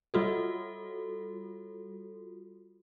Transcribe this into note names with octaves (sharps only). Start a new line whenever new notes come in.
G3 F4 F#4 A4